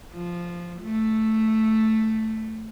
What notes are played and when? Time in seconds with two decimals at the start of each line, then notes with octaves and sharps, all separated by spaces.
0.13 F3
0.82 A3